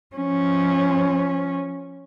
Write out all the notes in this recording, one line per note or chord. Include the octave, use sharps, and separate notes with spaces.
F3 C#4